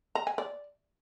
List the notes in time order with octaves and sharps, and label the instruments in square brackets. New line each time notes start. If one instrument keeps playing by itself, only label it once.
[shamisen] A#5
G#5
D5